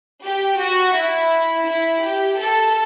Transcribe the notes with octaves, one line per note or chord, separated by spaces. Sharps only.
G4
F#4
E4
E4
G4
A4